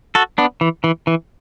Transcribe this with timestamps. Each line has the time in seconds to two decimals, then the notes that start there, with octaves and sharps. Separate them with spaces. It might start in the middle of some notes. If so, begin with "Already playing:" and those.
0.15 F#4 A4
0.38 B3 D4
0.61 E3
0.84 E3
1.07 E3